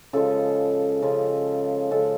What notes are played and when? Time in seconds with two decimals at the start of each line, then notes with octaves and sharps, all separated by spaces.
0.13 C#3 F3 G#3 A4
1.02 C#3 F3 G#3
1.91 C#3 F3 G#3 A4